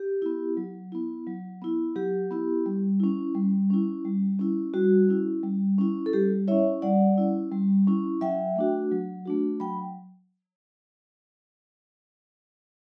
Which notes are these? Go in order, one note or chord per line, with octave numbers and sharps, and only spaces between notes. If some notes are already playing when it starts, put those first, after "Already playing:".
Already playing: G4
B3 E4
F#3
B3 E4
F#3
B3 E4
F#3 G4
B3 E4
G3
C#4 E4
G3
C#4 E4
G3
C#4 E4
G3 F#4
C#4 E4
G3
C#4 E4
A4
G3 G4
C#4 E4 C#5 E5
G3 D5 F#5
C#4 E4
G3
C#4 E4
F#3 E5 G5
A3 D4 F#4
F#3
A3 D4 F#4
F#3 G5 B5